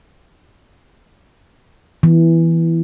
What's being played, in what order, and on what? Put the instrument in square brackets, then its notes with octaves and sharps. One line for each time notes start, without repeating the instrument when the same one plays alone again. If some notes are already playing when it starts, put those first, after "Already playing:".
[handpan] E3